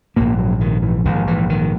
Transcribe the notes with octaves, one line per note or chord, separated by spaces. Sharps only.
A#1 G#2 A#3
F#3
D#3
E3
A#1 G#2 D#3
E3
D#3